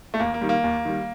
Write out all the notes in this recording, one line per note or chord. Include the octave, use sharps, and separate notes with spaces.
A3
D#2 A#3
A#3
D#3 G3
A#3
D#2
D#3 G3